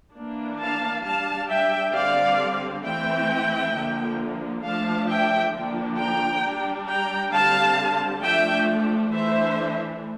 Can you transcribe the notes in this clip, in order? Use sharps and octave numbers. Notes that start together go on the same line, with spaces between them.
E3 A#3 D4
F5 A5
G3 D4 F5 A5
E5 G5
D3 G3 C4 D5 F5
E3 A3 C4 E5 G5
D3 F3 A#3
F3 A3 D4 F5 A5
E5 G5
D3 F3 A#3 D4
G5 A#5
G3 D4
G5 A#5
D3 G3 C4 F5 A5
F3 A3 D4 E5 G5
E3 A3 D4 C5 E5